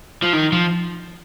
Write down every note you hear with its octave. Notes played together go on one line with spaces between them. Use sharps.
F3
D#3
F3